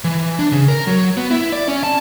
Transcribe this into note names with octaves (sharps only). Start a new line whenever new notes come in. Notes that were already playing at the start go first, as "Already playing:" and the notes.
E3
D4
C#3
A#4
F#3
B3
E4
D5
C#4
A5